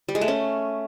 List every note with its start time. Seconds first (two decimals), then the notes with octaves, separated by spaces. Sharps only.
0.09 G3
0.15 G#3
0.21 A3
0.28 C#4